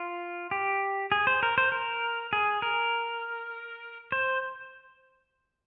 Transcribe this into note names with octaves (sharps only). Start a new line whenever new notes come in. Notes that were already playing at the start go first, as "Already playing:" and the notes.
Already playing: F4
G4
G#4
C5
A#4
C5
A#4
G#4
A#4
C5